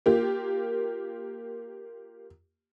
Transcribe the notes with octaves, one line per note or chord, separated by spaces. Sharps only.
A#3 F4 G4